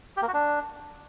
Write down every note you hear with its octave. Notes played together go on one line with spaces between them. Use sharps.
G4
A#3
F#4
D4